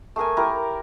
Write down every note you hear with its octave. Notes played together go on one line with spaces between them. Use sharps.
A3 G#4 A#4 G#5
E4 G4 A#4